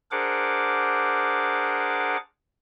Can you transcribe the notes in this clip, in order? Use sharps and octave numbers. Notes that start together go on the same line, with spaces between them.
D4 G#4 A#4 C5 F#5 D6